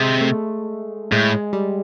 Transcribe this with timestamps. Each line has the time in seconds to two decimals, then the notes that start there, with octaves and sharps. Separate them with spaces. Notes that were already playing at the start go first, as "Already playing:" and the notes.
Already playing: C3 G#3
0.21 A3
1.12 A2 G#3
1.32 G#3
1.53 G3